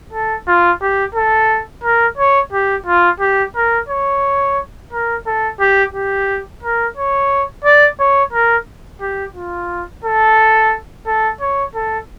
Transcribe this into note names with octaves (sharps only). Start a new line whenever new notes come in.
A4
F4
G4
A4
A#4
C#5
G4
F4
G4
A#4
C#5
A#4
A4
G4
G4
A#4
C#5
D5
C#5
A#4
G4
F4
A4
A4
C#5
A4